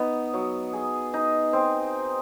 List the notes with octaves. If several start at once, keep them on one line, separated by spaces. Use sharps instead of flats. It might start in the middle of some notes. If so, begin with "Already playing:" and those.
Already playing: B3 D#4
F#3
G#4
D#4
C4